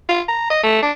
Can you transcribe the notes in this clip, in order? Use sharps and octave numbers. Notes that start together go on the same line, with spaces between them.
F4
A#5
D#5
A3
D4